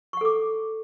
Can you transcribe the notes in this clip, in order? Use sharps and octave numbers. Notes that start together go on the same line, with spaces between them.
A4 F#5 C#6 D6